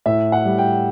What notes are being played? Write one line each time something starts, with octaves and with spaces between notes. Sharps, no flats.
A2 E5
F#5
G3
G5